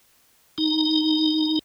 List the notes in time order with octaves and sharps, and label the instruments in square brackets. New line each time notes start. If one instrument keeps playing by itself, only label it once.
[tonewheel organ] D#4